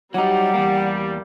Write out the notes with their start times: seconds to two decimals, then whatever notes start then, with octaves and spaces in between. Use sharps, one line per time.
0.14 F#3 G3 D#4 F#5
0.54 E2 A#3